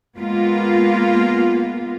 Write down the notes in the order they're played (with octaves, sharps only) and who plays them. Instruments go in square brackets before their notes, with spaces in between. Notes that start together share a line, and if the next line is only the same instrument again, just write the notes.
[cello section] G#3 A#3 B3 F4